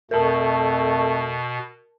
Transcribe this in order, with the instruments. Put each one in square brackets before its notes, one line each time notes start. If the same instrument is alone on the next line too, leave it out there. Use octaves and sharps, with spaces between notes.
[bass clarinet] F2 [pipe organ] B2 [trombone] A3 [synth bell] A#4 A5